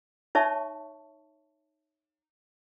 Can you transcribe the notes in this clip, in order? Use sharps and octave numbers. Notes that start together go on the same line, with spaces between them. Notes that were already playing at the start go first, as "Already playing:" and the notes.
D#4 C#5 E5 A5 C#6